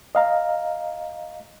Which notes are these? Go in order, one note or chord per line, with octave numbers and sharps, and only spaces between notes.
D#5 F5 A#5